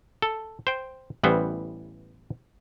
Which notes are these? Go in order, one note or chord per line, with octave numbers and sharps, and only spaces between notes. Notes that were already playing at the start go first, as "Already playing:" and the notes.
A4
C5 G5
A1 E3 G3 B3 C5